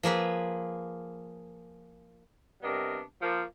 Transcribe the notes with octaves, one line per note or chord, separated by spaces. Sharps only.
F3 A#3 G#4 B4
C3 G3 B3 D4 A#4 D#5
F3 A#3